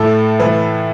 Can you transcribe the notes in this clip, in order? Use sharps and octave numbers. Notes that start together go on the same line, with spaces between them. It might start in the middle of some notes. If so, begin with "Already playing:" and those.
Already playing: A2 A4
E3 B4